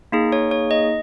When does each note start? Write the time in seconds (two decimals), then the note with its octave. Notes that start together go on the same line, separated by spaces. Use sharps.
0.12 A#3 D#4 G#4
0.32 C#5
0.51 C#5
0.71 D#5